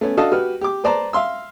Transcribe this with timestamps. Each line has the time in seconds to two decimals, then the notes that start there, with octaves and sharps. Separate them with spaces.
0.01 A3 B3 C#4
0.17 D4 F#4 A4 D#5 F5 A5
0.32 F#4 G4 B4 F6
0.61 G4 D6
0.84 B4 C5 D5 A5 A#5
1.13 E5 F5 C6 E6